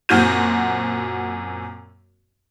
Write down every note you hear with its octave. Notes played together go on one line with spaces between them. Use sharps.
F#2 A#2 C4 F#4 G6 D#7